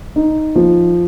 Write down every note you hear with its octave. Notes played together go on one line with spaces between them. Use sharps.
D#4
F3